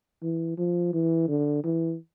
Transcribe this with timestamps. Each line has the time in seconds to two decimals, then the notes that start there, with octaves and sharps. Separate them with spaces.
0.23 E3
0.58 F3
0.93 E3
1.28 D3
1.64 E3